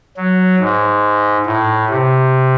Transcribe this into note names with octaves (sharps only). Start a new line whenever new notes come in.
F#3
G#2
A2
C3